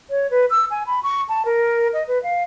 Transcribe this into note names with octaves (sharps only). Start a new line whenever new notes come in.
C#5
B4
E6
G#5
B5
C#6
A5
A#4
D#5
B4
F5